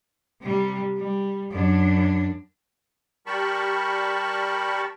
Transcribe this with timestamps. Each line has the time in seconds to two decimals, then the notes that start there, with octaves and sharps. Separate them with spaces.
0.42 C3 G3
0.97 G3
1.51 F#2 D4
3.26 G3 G4 A#4 A5 B5 C#6